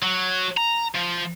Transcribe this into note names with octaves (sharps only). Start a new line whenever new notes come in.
F#3
A#5
F3